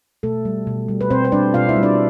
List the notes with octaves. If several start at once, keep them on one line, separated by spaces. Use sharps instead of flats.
B2 A3 A4
G3
B2
G3
B4
B2 C4 C5
C5
G3 D4 D5
B2 F4 F5
E4 E5
G3
D4 D5